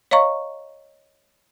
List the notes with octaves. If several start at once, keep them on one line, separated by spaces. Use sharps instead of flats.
C#5 D#5 F5 A#5 C#6